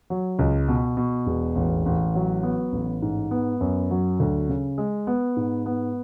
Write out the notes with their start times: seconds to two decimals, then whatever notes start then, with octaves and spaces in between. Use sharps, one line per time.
0.10 F#3
0.39 C#2
0.68 B2
0.97 B2
1.26 E1
1.55 A1
1.86 A1
2.15 F#3
2.43 B3
2.72 A1
3.02 G#2
3.31 B3
3.61 F#2
3.91 F#3
4.20 D2
4.49 C#3
4.78 G#3
5.07 B3
5.36 G#2
5.66 B3